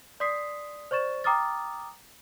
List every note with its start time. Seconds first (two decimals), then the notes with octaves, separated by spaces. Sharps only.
0.20 D5 C6 D#6 B6 C7
0.91 C5 D5 C#6 A6 E7
1.24 G5 A#5 D6 D#6 F6 A6